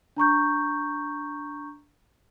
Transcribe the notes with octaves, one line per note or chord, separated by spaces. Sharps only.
D4 A#5 C#6 G6